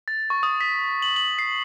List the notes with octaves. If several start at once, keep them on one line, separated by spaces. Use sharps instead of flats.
A6
C#6
D#6
B6
F#7
F#7
C7